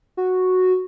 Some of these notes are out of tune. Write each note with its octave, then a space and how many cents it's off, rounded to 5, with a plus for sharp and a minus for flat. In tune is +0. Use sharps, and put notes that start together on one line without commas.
F#4 -5